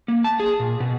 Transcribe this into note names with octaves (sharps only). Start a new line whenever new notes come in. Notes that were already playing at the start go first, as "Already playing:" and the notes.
A#3
A5
G#4
A#2
B2